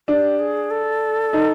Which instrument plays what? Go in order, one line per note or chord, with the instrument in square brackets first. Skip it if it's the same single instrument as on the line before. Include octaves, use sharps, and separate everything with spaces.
[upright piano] D4 [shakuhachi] G4
[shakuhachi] G#4
A4
[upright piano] D#4